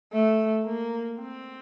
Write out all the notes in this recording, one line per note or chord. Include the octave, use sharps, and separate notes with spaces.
A3
A#3
C4